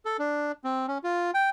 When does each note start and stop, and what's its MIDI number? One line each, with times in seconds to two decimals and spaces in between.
0.05 0.17 69
0.19 0.52 62
0.64 0.86 60
0.88 0.98 61
1.04 1.31 65
1.34 1.50 79